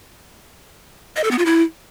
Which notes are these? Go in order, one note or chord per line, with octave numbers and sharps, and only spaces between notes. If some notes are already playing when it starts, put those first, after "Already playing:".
D#5
A4
B3
F4
E4